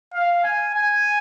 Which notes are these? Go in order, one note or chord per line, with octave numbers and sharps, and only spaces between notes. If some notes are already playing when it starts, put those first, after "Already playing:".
F5
G#5
G#5